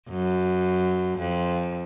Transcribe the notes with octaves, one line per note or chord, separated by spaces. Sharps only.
F#2
F2